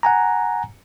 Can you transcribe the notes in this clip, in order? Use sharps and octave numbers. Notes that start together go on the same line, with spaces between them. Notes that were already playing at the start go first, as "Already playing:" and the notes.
F#5 G#5 A#5